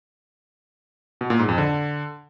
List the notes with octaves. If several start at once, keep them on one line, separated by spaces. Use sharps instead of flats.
B2
A#2
G#2
F2
D3